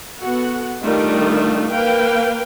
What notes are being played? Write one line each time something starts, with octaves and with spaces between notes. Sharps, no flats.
B3 F#4 A4 F#5
D#3 G3 A3 D4 D#4 F4
A#3 B4 F5 G5